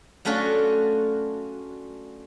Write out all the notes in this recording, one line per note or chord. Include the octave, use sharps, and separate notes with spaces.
F#3 A3 C#4 D4 F4 F#4